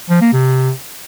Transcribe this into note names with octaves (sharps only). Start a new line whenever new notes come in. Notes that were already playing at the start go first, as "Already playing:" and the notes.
F3
A#3
C3